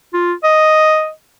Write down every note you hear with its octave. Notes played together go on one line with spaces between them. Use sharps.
F4
D#5